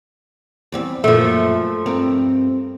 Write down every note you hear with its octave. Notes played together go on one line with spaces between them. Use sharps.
E2 G3 C4
F#2 A#2 F3 A3
G2 C4 A#4